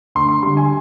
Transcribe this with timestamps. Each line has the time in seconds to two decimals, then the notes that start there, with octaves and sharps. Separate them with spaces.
0.15 D2 C6
0.29 C6
0.43 D3 G3 C6
0.57 G#5